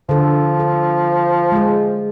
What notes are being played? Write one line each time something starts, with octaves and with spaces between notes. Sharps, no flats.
D3 F3 A4
A4
G#3 G#4